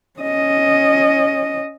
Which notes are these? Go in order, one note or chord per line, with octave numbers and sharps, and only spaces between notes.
C#4 D#5